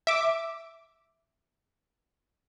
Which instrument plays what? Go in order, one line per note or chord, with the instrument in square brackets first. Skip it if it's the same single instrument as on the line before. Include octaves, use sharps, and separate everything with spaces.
[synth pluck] E5 D6